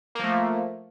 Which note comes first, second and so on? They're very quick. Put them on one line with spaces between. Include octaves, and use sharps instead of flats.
A#3 F3 A3